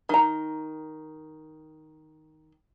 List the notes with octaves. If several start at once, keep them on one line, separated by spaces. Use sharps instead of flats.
D#3 A#5